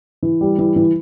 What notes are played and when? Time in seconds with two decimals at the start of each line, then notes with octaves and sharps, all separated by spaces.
0.23 E3
0.41 G3
0.59 E3
0.76 E3